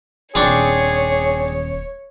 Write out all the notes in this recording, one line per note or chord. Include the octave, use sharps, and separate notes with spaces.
D#1 C4 D4 G#4 C#5 C#6